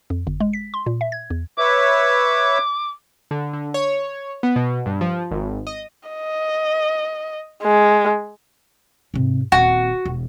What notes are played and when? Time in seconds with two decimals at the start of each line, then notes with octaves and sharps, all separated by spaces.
0.10 F2
0.27 G1
0.40 G#3
0.53 B6
0.74 C6
0.86 A#2
1.01 E5
1.12 G#6
1.30 E2
1.58 B4 C#5 E5 D6
3.31 D3
3.53 D3
3.74 C#5
4.43 B3
4.56 B2
4.86 G2
5.01 F3
5.31 G#1
5.67 D#5
6.09 D#5
7.63 G#3
9.14 G#2 C3
9.52 D#1 C4 F#4
10.05 E1